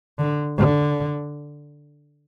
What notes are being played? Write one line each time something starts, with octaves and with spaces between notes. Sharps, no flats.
D3
D3